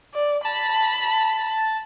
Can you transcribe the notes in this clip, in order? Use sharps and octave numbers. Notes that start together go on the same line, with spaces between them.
D5
A5 B5